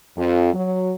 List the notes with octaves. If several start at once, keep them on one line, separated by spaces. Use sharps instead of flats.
F2
F#3